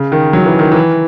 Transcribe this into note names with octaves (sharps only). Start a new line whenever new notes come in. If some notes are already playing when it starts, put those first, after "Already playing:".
Already playing: C#3
D#3
F#3
E3
D#3
E3